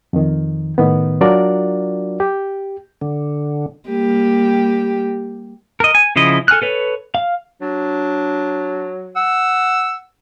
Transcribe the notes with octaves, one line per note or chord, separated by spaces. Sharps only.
F2 D#3
A2 D#3 B3
F#3 D4 F4 F#4 A#4 D5
G4
D3
G3 A#3 G4
A#4 D#5
G#5
C#3 F3 E4 D#5
A4 G#5 F6 F#6
A4 B4 C#5
F5
F#3 D4
F#5 E6